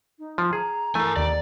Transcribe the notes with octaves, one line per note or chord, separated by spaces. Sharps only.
D#4
F3
G#4 A#5
E3 A3 A#4 G#5
D#2 D#3 D5